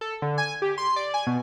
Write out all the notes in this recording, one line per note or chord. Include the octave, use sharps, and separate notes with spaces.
A4
D3
G#5
G4
C6
D5
G#5
B2